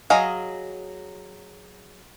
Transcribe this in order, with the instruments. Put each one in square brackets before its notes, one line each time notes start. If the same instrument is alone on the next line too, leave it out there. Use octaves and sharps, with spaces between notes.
[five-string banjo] F#3 G#4 D#5 F5